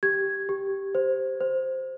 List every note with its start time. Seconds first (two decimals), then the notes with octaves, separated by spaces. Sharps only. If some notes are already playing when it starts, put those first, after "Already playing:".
0.03 G4 G#6
0.49 G4
0.95 C5
1.41 C5